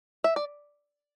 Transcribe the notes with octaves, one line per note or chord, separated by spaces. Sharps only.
E5
D5